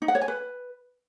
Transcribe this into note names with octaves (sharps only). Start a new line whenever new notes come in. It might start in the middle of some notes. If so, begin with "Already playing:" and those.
D#4
F#5
C#5
G#5
B4